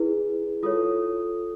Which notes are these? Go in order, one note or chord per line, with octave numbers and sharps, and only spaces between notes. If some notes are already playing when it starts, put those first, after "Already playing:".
Already playing: E4 G#4 B4
F4 A4 C#5 D#6